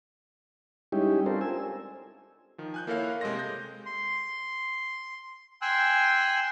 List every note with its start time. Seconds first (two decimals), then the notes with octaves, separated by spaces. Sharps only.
0.92 G3 G#3 C#4 D#4 E4 G4
1.26 C4 D4 F4 A4 A#4 C5
1.41 G#5 E6
2.58 D#3 F3
2.74 G#5 F#6 G6
2.87 A#3 E4 A4 A#4 C#5 F5
3.21 C3 G#3 A4 D#5 C6 A#6
3.39 G6
3.86 C6
5.62 G5 G#5 C6 E6 F#6